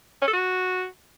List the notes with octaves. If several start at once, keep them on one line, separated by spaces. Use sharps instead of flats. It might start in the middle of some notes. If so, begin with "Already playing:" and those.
C#4
A4
F#4